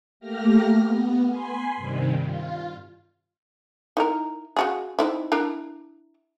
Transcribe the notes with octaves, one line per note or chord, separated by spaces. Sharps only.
A3 A#3 G4 F6 A#6
B3
G#5 B5 C6
G2 C3 D#3 G3
F4
D#4 E4 A#4
C#3 F#4 G#4
C4 D#4 E4
D4 E4 A#4